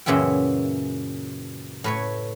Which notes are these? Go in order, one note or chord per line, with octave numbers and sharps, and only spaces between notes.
F#2 A#2 C#3 E3 E5 G5
A2 B4 C#5